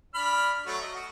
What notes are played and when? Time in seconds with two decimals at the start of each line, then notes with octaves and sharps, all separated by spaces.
0.15 D4 B5 F6
0.67 F#3 A3 F#4
0.82 D#5
0.94 F#4